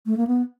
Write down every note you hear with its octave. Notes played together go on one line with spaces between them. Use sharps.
A3
A#3
B3